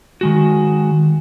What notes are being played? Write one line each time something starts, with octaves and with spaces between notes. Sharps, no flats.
D#3 G#3 F#4